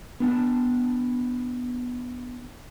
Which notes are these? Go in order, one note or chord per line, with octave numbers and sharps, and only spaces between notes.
B3 D4 A5